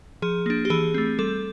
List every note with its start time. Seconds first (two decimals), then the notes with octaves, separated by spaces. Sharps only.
0.22 F3 G#4
0.46 A#3 D4
0.65 G4
0.70 E3 G#4
0.94 A3 C4
1.19 G3 A4